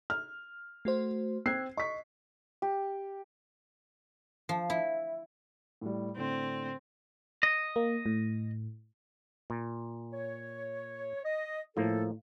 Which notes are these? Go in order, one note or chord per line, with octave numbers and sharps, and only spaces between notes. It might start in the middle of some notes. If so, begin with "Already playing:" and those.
F6
A3 F#4 C5
C4 E6 F#6 G#6 C7
D#5 C#6 B6
G4
F3
E4
A2 G3
A2 D3 C4
D#5
A#3
A2
A#2
C#5
D#5
A2 F3 A#3 A4